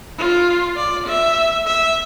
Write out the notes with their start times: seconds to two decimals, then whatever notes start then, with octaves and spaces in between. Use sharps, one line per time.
0.18 F4
0.76 D5
1.07 E5
1.66 E5